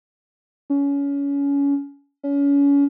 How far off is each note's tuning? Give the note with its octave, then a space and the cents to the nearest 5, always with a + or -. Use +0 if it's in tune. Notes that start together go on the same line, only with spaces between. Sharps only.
C#4 +25
C#4 +30